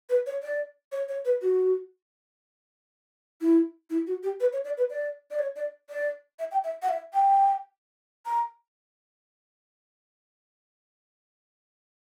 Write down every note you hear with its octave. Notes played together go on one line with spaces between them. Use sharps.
B4
C#5
D5
C#5
C#5
B4
F#4
E4
E4
F#4
G4
B4
C#5
D5
B4
D5
D5
C#5
D5
D5
E5
G5
E5
F#5
E5
G5
A#5